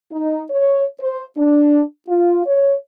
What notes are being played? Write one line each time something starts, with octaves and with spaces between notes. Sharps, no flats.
D#4
C#5
C5
D4
F4
C#5